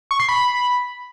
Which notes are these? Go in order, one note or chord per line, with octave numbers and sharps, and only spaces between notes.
C#6
C7
B5